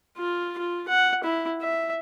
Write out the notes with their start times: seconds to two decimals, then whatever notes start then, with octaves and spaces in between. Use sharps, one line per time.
0.17 F4
0.58 F4
0.88 F#5
1.24 E4
1.61 E5